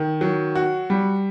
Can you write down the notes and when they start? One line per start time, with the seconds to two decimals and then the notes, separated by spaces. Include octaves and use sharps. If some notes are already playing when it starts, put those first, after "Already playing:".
Already playing: D#3
0.21 F#3
0.55 F#4
0.90 G3